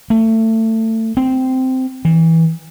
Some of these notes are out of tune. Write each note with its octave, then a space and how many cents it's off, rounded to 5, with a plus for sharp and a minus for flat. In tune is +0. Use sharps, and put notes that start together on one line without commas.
A3 +25
C4 -10
E3 -15